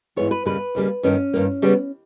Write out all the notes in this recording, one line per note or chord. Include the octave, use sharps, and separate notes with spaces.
G#2 E3 G#3 B3 C#5
B4
D#2 C#3 G3 A#3 B4
D#2 C#3 G3 A#3
G2 D#3 A#3 C#4
G2 D#3 A#3
C#3 G3 B3